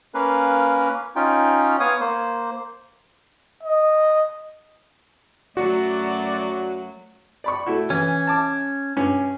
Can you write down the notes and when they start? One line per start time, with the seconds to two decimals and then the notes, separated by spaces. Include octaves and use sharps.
0.14 A#3 C#4 A#4 B4 F5
1.16 C#4 D#4 F4 G5
1.80 B3 C#5 F5 D#6
2.00 A#3 C5
3.63 D#5
5.57 F#2 F#3 A3 F#4 D5
7.44 D5 B5 C#6
7.66 A3 E4 F#4
7.90 E3 C#4
8.27 A5 D6
8.97 G2 C#4